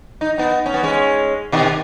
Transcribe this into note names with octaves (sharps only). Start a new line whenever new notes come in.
D#4
B3 D#4
C#4
B3
G#3 C#4
B2 D#3